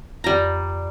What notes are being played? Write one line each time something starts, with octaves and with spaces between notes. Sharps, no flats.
F2 G3 A#5 A#6